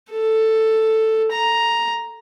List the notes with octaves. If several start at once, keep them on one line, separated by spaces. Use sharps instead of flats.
A4
A#5